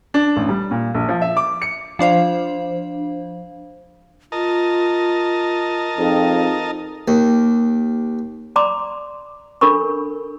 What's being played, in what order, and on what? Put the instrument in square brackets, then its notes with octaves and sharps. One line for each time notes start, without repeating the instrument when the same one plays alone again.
[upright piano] D4
A1
G3
A#2
A#1
F3
E5
D6
C#7
[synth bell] F3 D4 C5 F5
[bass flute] F4 [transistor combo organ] A#4 D#5 A5
[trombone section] F2 [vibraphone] D#4 F4 G#4
[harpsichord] D#2
[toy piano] D5 A#5 C6 D6
D4 A4 A#4 B5 C#6